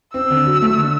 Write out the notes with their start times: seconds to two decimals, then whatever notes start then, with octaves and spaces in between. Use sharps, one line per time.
0.14 C4 E6
0.30 D3
0.46 F#3
0.62 A3
0.77 D3